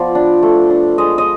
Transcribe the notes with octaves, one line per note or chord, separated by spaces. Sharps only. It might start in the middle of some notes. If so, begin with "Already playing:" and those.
Already playing: F3 B3 D5
D4
A3
D4
G#3 D#5
D#5